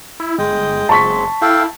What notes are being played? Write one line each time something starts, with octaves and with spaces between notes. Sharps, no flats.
E4
G1 G#3 D#5 G5
F#1 G#3 C4 A5 C#6 B6
E4 A4 F5 G5